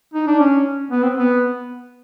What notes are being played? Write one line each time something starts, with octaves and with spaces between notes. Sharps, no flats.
D#4
D4
C#4
B3
C4
B3